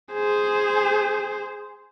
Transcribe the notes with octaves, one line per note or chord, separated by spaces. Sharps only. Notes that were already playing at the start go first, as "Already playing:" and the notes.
G#4 C5